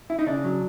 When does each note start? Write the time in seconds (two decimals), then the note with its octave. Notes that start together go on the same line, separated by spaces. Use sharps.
0.10 E4
0.19 D#4
0.27 C#3 D4
0.44 F#3